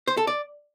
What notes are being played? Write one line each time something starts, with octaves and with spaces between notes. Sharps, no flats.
C5
A4
D5